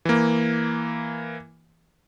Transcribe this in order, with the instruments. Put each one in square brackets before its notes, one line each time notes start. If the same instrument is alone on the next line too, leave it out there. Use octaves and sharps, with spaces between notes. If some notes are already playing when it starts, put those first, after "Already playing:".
[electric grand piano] E3 A#3